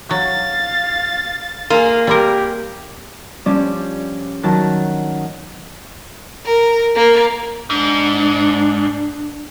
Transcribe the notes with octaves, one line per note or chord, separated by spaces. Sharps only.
F#3 F5 A6
A#3 F4 G#4
G3 C4 G4 A#4
F3 G3 C#4 D4 D5
D#3 F#3 A5
A#4
A#3
G#2 D4